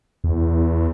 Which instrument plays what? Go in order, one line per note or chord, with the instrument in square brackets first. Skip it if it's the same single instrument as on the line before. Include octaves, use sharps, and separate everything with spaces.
[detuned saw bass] E2